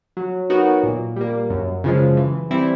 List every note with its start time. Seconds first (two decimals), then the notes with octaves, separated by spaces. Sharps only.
0.17 F#3
0.50 B3 D#4 F#4 A#4
0.83 A#2
1.16 G3 A#3
1.50 F#2
1.84 C#3 F3 G#3
2.17 E3
2.51 G3 C4 E4